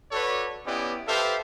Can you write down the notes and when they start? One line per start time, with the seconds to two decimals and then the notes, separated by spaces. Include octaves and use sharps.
0.11 F#4 A4 B4 C#5 D5
0.65 B3 C#4 E4 G4 D5 D#5
1.07 G4 A4 B4 C5 E5 F5